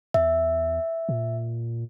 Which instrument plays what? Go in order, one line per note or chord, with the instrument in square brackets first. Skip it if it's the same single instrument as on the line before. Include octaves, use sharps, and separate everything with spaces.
[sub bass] E2 [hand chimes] E5
[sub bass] A#2